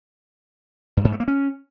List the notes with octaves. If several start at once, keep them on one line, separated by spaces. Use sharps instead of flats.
G2
G#2
A3
A#3
C#4